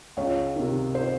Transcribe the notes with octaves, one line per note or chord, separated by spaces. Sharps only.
C#2 C#5
C3 D#3
C5